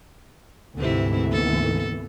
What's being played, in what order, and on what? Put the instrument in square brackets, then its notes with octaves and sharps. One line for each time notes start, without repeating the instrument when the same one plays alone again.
[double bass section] D2 G#2 E3 [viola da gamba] C3 C4 E4
[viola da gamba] A#3 B3 A4